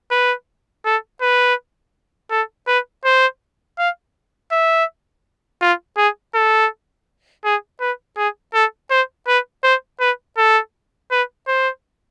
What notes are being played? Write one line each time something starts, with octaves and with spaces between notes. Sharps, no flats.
B4
A4
B4
A4
B4
C5
F5
E5
F4
G#4
A4
G#4
B4
G#4
A4
C5
B4
C5
B4
A4
B4
C5